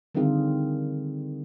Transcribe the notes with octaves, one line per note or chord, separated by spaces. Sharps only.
D3 D#3 G3 C4 F4 G#4